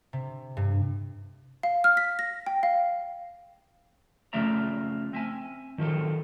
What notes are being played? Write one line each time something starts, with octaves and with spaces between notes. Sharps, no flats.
C3
G2
F5
F6
B6
A#6
G5
F5
C#3 F3 A3 D5 E5 A#5
C4 E5 G#5
D#3 F3 F#3 F4 A4